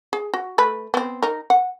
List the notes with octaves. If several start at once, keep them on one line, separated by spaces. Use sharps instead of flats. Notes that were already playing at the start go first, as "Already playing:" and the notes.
G#4
F#4
A3 B4 B5
B3 C4
D#4 A#4
F#5